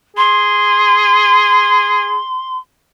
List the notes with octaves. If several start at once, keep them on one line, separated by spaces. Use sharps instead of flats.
G#4 C6